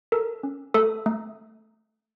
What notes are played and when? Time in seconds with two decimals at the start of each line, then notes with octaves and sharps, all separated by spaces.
0.12 A4 A#4
0.43 C#4
0.74 A3 A4
1.06 A3